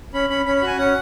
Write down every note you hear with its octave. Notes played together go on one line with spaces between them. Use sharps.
C#4 B5
C#4 B5
C#4 B5
B5
F#4
G#5
C#4 F#5